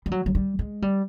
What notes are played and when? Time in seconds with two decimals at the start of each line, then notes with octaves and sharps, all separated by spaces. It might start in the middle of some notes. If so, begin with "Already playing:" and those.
0.06 G3
0.11 F#3
0.26 F#3
0.35 G3
0.59 G#3
0.82 G3